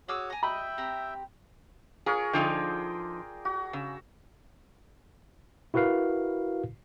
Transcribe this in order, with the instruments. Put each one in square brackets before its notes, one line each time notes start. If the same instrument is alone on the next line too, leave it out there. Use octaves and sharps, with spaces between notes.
[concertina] F#4 C#5 [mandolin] G#4 D6 E6
[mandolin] G#5 A#5
[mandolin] D#5 [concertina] E5 G5 [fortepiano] B5
[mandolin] C4 G4 A#5
[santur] F4 A#4 C#5 [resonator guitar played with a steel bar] G#4
[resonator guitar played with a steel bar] D3 F3 D#4 [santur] G#4 D5 G5
[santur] F#4
[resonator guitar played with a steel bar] C#3 [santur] E6
[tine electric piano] E4 F#4 A#4 B4 F5